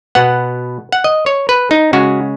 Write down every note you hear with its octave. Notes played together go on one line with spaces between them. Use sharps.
B2 B3 F#5
F#5
D#5
C#5
B4
D#4
C#3 G#3 C#4 F#4